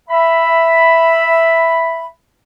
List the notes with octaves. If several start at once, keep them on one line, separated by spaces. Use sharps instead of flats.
E5 B5